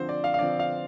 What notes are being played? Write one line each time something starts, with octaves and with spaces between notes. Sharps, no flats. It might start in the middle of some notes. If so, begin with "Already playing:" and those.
Already playing: D3 F3 C4 C5
D5
F5
F5
D3 F3 C4 D5
F5